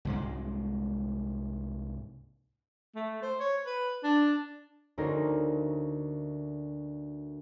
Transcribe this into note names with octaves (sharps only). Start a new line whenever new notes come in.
C2 G#2 G#3
A3
C5
C#5
B4
D4
D2 C#4 D#4 A#4 C5 A#6